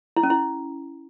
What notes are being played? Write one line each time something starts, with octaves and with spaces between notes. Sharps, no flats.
E4
C#4
E4